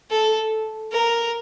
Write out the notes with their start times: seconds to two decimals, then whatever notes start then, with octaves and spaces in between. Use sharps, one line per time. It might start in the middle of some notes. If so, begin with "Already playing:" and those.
0.10 A4
0.92 A#4